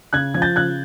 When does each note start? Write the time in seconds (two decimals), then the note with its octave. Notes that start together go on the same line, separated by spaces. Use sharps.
0.13 C#3 F#6 G#6
0.34 F3 G#6
0.42 G6 A6
0.56 C#3 F#6 G#6